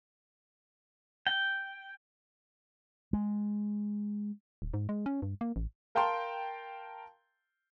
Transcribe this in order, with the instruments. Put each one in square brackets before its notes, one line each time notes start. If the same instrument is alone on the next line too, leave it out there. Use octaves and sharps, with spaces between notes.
[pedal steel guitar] G5
[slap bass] G#3
[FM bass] D1
G#2
G#3
C#4
G2
A#3
A1
[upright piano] A#4 F5 G5 A5 A#5 C6